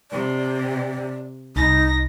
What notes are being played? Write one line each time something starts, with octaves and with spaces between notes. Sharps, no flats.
C3 D5
C2 D#4 A#6